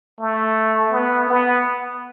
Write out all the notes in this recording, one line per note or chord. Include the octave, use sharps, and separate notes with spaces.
A3
B3
B3